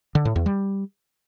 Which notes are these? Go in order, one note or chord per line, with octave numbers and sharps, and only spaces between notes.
D3
A2
E2
G3